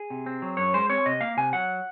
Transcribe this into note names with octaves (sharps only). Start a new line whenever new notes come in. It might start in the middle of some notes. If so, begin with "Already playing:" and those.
Already playing: G#4
C3
C4
F#3
F#2 C#5
G#3 C5
C4 C#5
C3 D#5
A#3 F5
C3 G#5
F#3 F#5